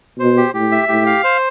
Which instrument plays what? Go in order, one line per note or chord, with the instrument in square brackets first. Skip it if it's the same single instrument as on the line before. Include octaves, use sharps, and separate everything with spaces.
[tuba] B2 [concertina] C5
[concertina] G4
[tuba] A2 [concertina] G4
[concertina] E5
[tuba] A2 [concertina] G4
[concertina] F5
C5